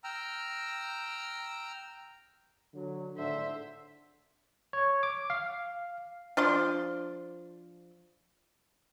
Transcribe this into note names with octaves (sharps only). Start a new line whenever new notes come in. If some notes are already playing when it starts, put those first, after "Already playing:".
G5 A#5 E6 F6
D3 F#3
G#1 A2 D3 C5 E5
C#5
D6
F5
F3 D4 C6